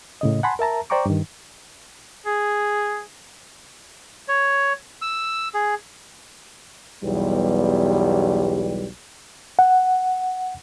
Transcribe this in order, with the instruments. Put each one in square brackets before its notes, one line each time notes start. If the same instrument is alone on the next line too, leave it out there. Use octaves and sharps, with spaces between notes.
[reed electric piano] A2 C#3 D#5
F#5 G#5 A5 B5 C6
A#4 E5 A5 A#5
C5 D5 G5 A#5 C#6 D6
G2 D#3
[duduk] G#4
[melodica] C#5
E6
G#4
[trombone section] B1 E2 G3
[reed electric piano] F#5